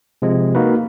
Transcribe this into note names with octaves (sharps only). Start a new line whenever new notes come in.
C3 F3 G#3
A#3 D#4 F#4 B4